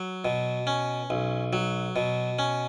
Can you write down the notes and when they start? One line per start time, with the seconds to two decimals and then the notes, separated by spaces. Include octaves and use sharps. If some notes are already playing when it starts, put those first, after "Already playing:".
Already playing: F#3
0.25 B2
0.67 C#4
1.10 B1
1.53 F#3
1.96 B2
2.39 C#4